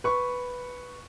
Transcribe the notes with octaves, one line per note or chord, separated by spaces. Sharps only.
B4 C#6